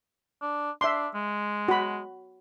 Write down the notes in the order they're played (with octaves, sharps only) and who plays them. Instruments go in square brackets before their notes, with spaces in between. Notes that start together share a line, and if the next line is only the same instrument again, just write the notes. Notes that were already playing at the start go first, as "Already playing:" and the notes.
[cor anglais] D4
[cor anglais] D4 [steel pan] E5 C6
[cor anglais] G#3
[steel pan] F#4 B5